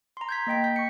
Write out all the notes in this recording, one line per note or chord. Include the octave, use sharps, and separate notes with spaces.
A#5 C6
G6 G#6 B6
A#3 D#5 G5 B6
G6 B6
C#6 C#7